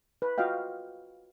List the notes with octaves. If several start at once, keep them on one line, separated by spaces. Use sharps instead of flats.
B4
F4 F#4 D#5 F5 G5